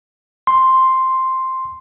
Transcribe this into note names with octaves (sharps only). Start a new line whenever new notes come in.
C6